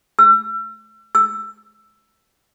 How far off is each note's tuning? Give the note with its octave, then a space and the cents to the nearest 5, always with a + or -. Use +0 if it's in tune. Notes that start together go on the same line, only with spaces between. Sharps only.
E6 +40
E6 +10